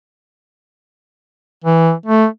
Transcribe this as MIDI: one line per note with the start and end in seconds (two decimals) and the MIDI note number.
1.64 1.93 52
2.06 2.26 57